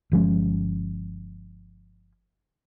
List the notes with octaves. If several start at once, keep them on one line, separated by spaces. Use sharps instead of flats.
G1 F3 G#3 C#4